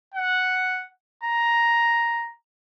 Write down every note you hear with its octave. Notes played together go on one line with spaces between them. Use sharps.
F#5
A#5